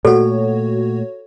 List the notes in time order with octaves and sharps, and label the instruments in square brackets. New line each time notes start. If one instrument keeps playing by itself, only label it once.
[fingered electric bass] A#2 A3 [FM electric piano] F#4 C#5 [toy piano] A4